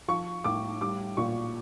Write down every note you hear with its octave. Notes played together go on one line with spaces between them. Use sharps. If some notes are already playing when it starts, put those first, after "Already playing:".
F3 C#6
A2 D6
G3 D6
A#2 C#6